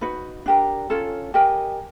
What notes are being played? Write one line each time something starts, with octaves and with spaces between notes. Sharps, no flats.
D#4 F#4 B4
D4 G4 A#4
C#4 F4 A4
G4 A#4 D#5 G#5